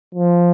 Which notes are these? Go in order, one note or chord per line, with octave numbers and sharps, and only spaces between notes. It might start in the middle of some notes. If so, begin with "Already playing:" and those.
F3